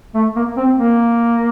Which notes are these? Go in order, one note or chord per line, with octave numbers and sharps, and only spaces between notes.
A3
A#3
C4
A#3